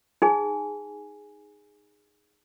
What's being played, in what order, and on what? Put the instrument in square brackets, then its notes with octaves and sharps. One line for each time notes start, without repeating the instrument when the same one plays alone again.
[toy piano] D#4 G#4 G#5